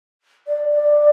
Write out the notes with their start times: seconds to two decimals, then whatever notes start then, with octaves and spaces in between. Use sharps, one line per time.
0.47 D5
0.70 D5